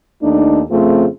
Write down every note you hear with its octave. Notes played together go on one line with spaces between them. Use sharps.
D#2 A3 D4 D#4
F2 C#3 A3 C4 F4 G#4